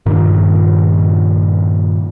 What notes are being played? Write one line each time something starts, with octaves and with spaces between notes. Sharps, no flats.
G2 A#2 D#3